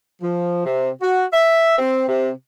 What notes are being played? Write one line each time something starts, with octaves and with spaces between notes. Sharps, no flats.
F3
C3
F#4
E5
C4
C3